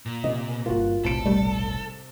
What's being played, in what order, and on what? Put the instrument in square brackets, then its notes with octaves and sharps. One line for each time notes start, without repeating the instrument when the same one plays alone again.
[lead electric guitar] A#2
[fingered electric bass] C3 [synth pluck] D#5
[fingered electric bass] G1 A#3 [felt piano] F4 F#4
[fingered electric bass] F1 B1 A2 [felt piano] C3 D7 [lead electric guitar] A4
[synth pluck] G3 A3